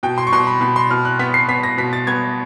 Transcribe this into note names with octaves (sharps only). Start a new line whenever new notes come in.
B2 G5
C6
C#6
B2 C6
B5
B2 B5
C6
B2 F6
F#6
B3 B6
C7
B3 B6
A#6
B2 B6
A6
B3 G#6